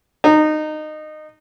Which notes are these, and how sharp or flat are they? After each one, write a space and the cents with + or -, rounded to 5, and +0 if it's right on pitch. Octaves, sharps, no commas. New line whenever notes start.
D#4 -20